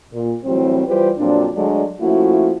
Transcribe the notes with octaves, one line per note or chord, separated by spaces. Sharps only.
A#2
A2 E3 F#3 G3 C4
E3 G3 F4 G4 B4 C5
F2 A#2 F#3 C4 D4
D3 F#3 G#3 A3 D4
F3 A3 A#3 C#4 E4 F#4